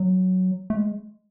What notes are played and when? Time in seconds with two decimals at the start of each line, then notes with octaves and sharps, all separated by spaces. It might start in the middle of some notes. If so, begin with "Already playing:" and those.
Already playing: F#3
0.70 A3
0.77 G#3